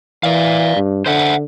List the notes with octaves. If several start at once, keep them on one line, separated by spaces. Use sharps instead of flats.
E3 D5 F5
G2
D3 C5 E5 F#5